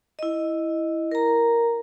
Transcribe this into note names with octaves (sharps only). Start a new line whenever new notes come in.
E4 D#5
A#4 A#5